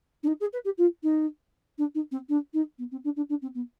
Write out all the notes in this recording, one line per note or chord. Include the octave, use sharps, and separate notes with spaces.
D4
D#4
G#4
B4
G4
F4
D#4
D4
D#4
C4
D4
D#4
B3
C4
D4
D4
D4
C4
B3